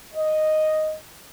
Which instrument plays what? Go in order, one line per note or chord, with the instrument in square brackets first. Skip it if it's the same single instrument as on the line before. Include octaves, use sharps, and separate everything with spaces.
[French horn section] D#5